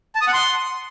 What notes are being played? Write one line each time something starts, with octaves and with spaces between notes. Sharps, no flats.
A5
D#6
F#5
C6